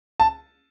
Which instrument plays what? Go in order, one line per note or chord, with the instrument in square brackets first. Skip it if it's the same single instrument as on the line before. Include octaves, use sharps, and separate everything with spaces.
[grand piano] A5